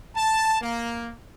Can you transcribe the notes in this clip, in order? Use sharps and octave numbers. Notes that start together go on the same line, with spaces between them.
A5
A#3